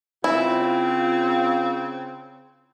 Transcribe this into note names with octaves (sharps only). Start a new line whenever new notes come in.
C#3 C4 E4 F4